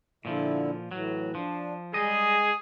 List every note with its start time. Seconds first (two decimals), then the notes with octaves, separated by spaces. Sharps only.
0.25 A#2 D3 F3 E4
0.91 A2 E3 F#3
1.35 F3 D4
1.94 G3 G#3 G#4 D#5